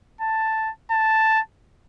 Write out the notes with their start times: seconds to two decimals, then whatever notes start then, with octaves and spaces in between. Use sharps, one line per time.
0.21 A5
0.91 A5